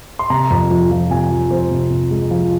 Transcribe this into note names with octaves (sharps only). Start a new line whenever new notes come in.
C6
C3 A#5
F2
F3
F3
C3 G#5
F3
F2 C5
C3
C3
G#3
F3